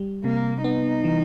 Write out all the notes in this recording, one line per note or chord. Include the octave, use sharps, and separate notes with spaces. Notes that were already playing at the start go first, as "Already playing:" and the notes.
Already playing: G3
C3 A#3
B3 D#4
E3